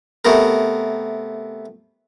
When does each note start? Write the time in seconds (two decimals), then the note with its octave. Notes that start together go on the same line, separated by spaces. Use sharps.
0.25 C3 A3 B3 A#4